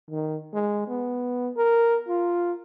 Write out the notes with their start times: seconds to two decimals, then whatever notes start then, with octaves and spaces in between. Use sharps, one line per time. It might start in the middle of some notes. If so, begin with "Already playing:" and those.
0.10 D#3
0.54 G#3
0.88 B3
1.57 A#4
2.08 F4